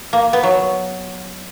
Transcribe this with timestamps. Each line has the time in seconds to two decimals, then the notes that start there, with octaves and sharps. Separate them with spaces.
0.13 A#3
0.33 B3
0.43 F#3